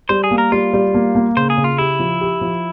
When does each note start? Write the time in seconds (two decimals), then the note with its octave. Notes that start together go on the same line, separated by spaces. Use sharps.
0.09 G3 C5
0.24 G#4
0.31 A#3
0.38 A#4
0.52 G3 F4
0.73 G3
0.94 A#3
1.15 A#3
1.37 C#3 C5
1.50 G#4
1.57 C#3
1.64 F4
1.78 E4 G4
1.99 F3
2.21 G4
2.41 F3